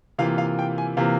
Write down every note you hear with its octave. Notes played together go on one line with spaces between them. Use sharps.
C3 E3 A#3 F4 F5
F5
G5
G#5
C3 E3 A#3 F4 F5